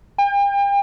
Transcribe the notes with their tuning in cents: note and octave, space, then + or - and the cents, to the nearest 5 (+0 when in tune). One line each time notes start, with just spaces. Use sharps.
G5 +40